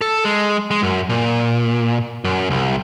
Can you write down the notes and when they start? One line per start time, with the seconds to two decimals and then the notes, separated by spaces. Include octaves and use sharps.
0.01 A4
0.25 G#3
0.71 G#3
0.83 F#2
1.10 A#2
2.25 F#2
2.51 C2